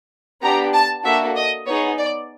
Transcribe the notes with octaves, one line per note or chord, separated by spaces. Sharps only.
B3 D4 G4 A#5
A5
A#3 D4 F#4 A4 E5
D#5
B3 D#4 G#4 C#5
D5